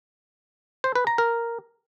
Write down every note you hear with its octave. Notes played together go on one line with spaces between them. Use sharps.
C5
B4
A#5
A#4